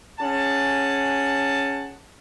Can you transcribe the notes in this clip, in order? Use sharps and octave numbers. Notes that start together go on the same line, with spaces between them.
C#4 G#4 F#5 A5